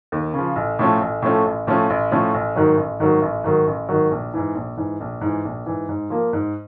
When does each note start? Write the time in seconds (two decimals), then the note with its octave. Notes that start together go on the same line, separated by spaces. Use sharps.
0.12 D#2
0.34 C#3 F3
0.56 A1
0.79 A2 F3 A3 C#4
1.01 A1
1.22 A2 F3 A3 C#4
1.45 A1
1.67 A2 F3 A3 C#4
1.90 A1
2.11 A2 F3 A3 C#4
2.34 A1
2.56 G#2 D#3 F#3
2.77 A1
3.00 G#2 D#3 F#3
3.22 A1
3.44 G#2 D#3 F#3
3.67 A1
3.89 G#2 D#3 F#3
4.11 A#1
4.34 G#2 E3
4.55 A#1
4.77 G#2 E3
5.00 A#1
5.21 G#2 E3
5.45 A#1
5.66 G#2 E3
5.89 G#2
6.10 F3 A#3
6.33 G#2